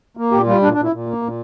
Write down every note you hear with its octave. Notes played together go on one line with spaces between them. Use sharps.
A#3
A#2 G4
G3 F4
A#2 D4
D4
A#2
E4
A#2
A#3
A#2